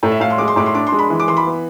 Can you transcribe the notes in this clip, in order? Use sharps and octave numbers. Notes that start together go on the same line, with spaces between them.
A2 A4
E5
A2 F5
C6
G#3 D6
C6
A2 D6
C6
D4 D6
C6
G#3
B5
E3
D6
E3 C6
B5
B3